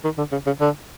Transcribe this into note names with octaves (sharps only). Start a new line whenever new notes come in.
D#3
D3
C#3
C#3
D3